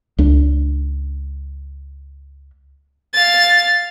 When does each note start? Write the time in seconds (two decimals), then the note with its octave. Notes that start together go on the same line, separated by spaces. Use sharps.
0.18 C#2 D4
3.14 F5 A6